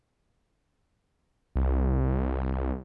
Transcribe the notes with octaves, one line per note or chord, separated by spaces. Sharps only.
C2